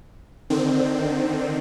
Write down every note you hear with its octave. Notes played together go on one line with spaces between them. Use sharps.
D3 D#3 C4